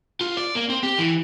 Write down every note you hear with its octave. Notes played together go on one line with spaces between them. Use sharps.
F4
D5
A#3
C4
G4
E3